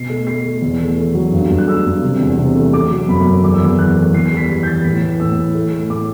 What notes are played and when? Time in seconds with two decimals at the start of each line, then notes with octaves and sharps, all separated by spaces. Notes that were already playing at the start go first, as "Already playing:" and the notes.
Already playing: B2 C7
0.10 A3
0.27 A3 C7
0.44 A3
0.62 E2
0.80 A3
0.98 A3
1.15 F#3
1.32 G2
1.50 G2
1.58 F#6
1.68 A3 E6
1.86 G2
2.03 C3
2.20 E2
2.38 C3
2.55 A3
2.73 A3 D6
2.91 F#3
3.08 F#2 B5
3.26 F#2
3.43 E2 D6
3.54 E6
3.61 E2 D6
3.79 E3 F#6
3.96 A3
4.14 E2 C7
4.26 C7
4.32 G3 B6
4.49 E3 B6
4.63 G6
4.67 E3 A6
4.84 A2 B6
5.01 E3
5.20 A2 E6
5.37 A2
5.55 A3
5.73 A3
5.90 A2 D6